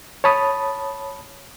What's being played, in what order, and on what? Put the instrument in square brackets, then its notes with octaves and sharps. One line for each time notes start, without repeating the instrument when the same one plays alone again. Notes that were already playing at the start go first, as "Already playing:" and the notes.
[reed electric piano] C#5 A5 B5 D#6